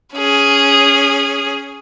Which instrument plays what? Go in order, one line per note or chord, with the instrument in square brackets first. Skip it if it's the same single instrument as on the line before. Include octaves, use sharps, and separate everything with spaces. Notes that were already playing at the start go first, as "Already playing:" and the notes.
[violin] C#4 G#4